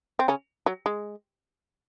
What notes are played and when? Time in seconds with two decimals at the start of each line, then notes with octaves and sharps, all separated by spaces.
0.19 C4
0.28 C#3 C#4
0.66 F#3
0.86 G#3